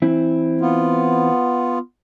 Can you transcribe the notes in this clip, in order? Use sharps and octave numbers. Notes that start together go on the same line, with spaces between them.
E3 C4 E4
B3 F4